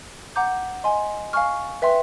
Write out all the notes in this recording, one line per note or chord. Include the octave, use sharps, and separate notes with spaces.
F#5 A#5 D6 G6
D#5 G#5 C6
F5 G#5 C#6 F6
B4 E5 G5 C6